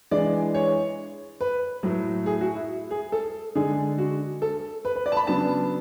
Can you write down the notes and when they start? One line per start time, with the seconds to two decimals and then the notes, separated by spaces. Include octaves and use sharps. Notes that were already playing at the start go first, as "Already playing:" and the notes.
0.11 E3 G#3 D4 D5
0.54 C#5
1.41 B4
1.83 A2 F#3 A3
2.26 G#4
2.41 F#4
2.55 E4
2.91 G#4
3.12 A4
3.55 D3 G#3 D4 G#4
3.98 F#4
4.42 A4
4.85 B4
4.96 B4
5.06 D5
5.12 A5
5.17 B5
5.27 C#3 F#3 B3 D4 A5